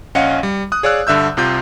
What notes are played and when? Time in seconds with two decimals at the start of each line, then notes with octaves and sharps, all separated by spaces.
0.15 A#1 C#4 D#5 F5 F#5 C#7
0.43 G3
0.72 D#6 F#6
0.83 G#4 C#5 D5 F5 E6 F#6
1.07 G2 D3 E5 E6 G6
1.37 C2 C3 F4 G6